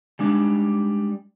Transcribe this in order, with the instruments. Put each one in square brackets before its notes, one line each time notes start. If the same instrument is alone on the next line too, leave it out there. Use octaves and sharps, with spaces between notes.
[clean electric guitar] G3 G#3 D4 D#4